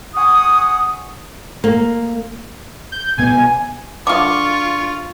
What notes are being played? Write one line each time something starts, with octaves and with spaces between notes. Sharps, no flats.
F#5 G#5 C#6 D#6
A#3
G6
C2 B2 B3 G#5
D3 F4 F5 C#6 D6